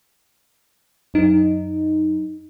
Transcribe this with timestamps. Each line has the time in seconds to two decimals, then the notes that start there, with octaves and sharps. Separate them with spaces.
1.14 F#2 D#4